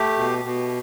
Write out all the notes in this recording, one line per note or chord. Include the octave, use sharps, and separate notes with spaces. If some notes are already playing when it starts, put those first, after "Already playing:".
Already playing: A3 G4
B2
B2